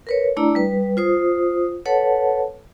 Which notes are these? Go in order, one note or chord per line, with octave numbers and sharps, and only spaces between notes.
A#4 B4 C#5
A3 D4 E4 D5 A#5
G3 B4
F4 C5 D#6
A4 B4 C#5 F#5 A5